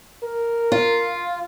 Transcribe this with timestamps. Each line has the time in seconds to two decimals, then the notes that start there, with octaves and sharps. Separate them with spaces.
0.23 A#4
0.72 F4